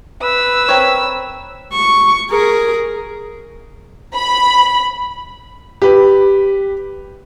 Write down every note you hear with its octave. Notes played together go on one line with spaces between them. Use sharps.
B4 E6
C4 A#4 C#5
C#6
G#4 A#4
B5
G4 B4